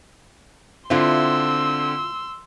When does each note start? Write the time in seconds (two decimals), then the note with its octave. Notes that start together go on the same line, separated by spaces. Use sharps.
0.90 D3 C4 E4 F4 C6 E6